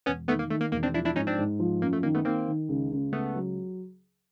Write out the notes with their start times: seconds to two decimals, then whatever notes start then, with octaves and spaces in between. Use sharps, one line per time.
0.06 E1 B3 C#4
0.28 D#3 A3 B3
0.39 A#3
0.50 D#3 A3
0.61 A#3
0.72 E1 A#3
0.83 C4 D4
0.94 F3 D4 E4
1.05 D4 E4
1.16 G#2 C#4 D#4
1.27 C4 D4
1.38 G#2
1.60 F3
1.81 F#2 A#3
1.93 A3
2.03 D#3 A#3
2.15 A3 B3
2.25 D#3 A#3 C4
2.48 D#3
2.69 C#2
2.91 C#2
3.12 C#2 A3 B3
3.35 F#3